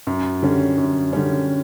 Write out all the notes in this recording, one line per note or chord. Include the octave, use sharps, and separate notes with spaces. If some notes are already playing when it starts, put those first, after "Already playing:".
F#2
D3 G3 C#4
F#2
D3 G3 C#4